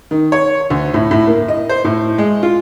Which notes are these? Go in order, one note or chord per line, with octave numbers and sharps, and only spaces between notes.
D#3
C#5
D2
A2
A2
A#3
D#5
C5
A2
G#3
F4